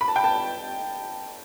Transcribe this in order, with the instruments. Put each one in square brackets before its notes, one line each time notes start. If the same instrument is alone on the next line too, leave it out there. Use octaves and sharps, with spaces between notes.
[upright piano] B5
A5
G5
A5